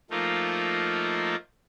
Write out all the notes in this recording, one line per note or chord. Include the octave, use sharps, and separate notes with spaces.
F3 A3 A#3 D#4 F4